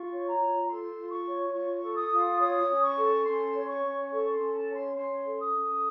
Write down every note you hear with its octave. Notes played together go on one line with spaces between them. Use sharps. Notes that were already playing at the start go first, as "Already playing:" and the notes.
Already playing: F4 C#6
C#5
A#5
F4
A4 C6
F4
C#6
C#5
F4 C#6
A4
D#6
F4
C#5 D#6
C#4
C#6
A4
C#4 C6
C#5
C#6
C#4
A4 C#6
C6
C#4
A5
C#5
C6
C#4 C6
A4
D#6
C#4